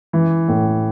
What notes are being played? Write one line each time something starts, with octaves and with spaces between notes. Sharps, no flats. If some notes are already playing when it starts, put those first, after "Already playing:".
E3
A2